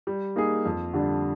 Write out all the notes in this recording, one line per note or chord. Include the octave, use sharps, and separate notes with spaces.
G3
A#3 D#4 G#4
F2
D3 G3 D4